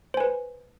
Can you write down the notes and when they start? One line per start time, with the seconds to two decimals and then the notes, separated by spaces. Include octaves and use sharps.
0.14 C5
0.17 G#5
0.20 B4